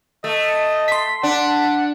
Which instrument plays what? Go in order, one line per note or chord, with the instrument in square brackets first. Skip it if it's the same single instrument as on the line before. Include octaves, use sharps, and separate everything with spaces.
[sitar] A3 [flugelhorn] D#5
[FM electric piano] C6 B6
[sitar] D4 [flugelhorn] F#5